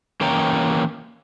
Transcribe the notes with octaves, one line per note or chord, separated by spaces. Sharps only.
E3 A#3 C#4 C#5 G5 A#5